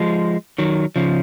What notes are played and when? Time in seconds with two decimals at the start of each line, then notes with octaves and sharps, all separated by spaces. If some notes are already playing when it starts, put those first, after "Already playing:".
Already playing: F3 G#3
0.58 D#3 F#3
0.96 C#3 F3